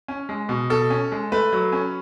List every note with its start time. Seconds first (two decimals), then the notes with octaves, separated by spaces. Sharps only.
0.08 C#4
0.29 G#3
0.49 B2
0.70 B2 A4
0.90 C#4
1.12 G#3
1.32 A3 B4
1.53 F#3
1.72 C#4